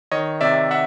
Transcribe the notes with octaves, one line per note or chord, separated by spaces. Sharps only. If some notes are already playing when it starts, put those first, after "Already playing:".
D#3 C#5 D#5
C3 D5 E5
E5 F#5